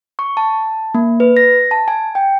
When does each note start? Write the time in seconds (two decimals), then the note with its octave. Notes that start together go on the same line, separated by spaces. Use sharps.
0.19 C#6
0.37 A5
0.94 A#3
1.20 B4
1.37 A#6
1.71 A5
1.88 G#5
2.15 G5